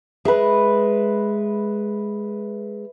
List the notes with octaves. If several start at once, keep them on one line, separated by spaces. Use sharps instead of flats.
G#3 B4 E5